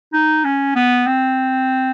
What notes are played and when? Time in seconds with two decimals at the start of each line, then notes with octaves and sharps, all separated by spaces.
0.13 D#4
0.45 C#4
0.75 B3
1.07 C4